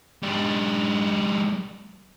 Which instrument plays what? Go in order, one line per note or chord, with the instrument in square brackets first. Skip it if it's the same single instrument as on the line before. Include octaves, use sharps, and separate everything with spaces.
[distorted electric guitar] G#2 D4